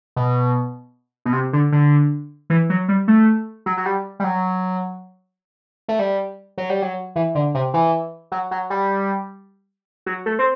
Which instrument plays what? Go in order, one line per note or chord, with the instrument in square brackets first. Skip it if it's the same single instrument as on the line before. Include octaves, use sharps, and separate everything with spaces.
[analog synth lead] B2
B2
C3
D3
D3
E3
F#3
G3
A3
F#3
F#3
G3
G3
F#3
A3
G3
F#3
G3
F#3
E3
D3
C3
E3
F#3
F#3
G3
F#3
A3
C4